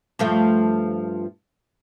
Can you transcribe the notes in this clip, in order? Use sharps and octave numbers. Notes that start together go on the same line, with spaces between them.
G2 F3 A3